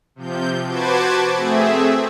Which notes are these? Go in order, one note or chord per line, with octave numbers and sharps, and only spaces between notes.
C3 F3 G6
F#4 B4 C5 A5 D6 G#6
A3 C4 G#4 E5